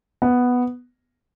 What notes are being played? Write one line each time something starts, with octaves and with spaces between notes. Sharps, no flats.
B3